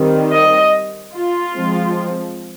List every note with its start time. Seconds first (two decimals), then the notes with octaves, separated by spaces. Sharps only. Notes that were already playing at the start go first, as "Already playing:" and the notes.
Already playing: D#3 G3 C4
0.31 D#5
1.13 F4
1.55 F3 G#3 C4